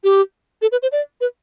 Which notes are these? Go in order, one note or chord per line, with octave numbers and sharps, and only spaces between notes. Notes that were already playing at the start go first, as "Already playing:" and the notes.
G4
A4
B4
C5
D5
B4